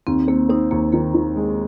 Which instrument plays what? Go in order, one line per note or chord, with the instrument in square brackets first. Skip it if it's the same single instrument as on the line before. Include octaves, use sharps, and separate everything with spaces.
[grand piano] D#2 [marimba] C4
[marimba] A#3 [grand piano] C4
[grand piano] C4 [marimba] D#4
[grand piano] D#2 [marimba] A#3
[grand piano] D#3 [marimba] A#3
[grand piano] D#3
G#3